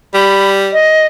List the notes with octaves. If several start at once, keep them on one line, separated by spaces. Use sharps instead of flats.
G3 B5
D#5